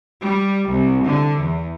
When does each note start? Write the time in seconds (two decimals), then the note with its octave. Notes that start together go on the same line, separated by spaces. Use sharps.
0.20 G3
0.69 C2
1.06 D3
1.39 E2